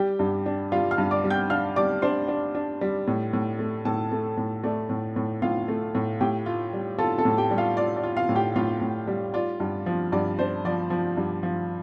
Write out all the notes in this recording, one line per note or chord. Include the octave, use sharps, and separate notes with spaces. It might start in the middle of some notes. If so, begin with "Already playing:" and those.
Already playing: G3 G4 G5
G2
D4
G3 F4 F5
F5 F6
G2
D5 D6
G3
G5 G6
D4 F5 F6
G3 D5 D6
D4 C5 C6
D4
D4
G3
A2
A2
A3
A2 A4 A5
A3
A2
A3 D5
A2
A2
A2 F4 F5
A3
A2
A2 G4 G5
F4
G3
F4 A4 A5
A4 A5
A2
G4 G5
G3
F4 F5
F4 D5
D5
F4
F4 F5
A2
G4 G5
A2 F4 F5
A2
G3
F4 D5
G2
F3
G2 D5
D4 C5
F3 D5
F3
G2
F3